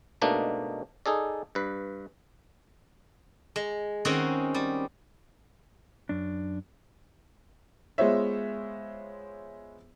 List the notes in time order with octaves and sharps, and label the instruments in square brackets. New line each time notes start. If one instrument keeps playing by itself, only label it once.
[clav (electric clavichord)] G#2 B2 A3 A#3 D4 D#4
D#4 G#4 A4 D5
G2 B4
[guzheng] G#3
D#3 C4 C#4 F#4 G#4
G3
[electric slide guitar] F#2 D4
[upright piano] G#3 B3 F4 C5 C#5 E5